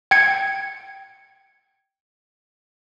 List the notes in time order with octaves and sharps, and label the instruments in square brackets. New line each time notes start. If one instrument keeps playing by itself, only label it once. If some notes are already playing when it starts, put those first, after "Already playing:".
[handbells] G5 G#6 C#7